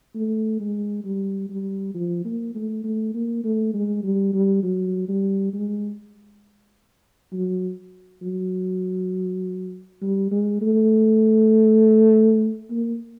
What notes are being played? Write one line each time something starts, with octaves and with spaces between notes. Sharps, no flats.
A3
G#3
G3
G3
F3
A#3
A3
A3
A#3
A3
G#3
G3
G3
F#3
G3
G#3
F#3
F#3
G3
G#3
A3
A#3